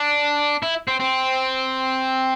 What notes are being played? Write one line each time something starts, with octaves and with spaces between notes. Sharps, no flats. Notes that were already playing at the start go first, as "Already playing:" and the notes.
Already playing: D4
E4
C4
C4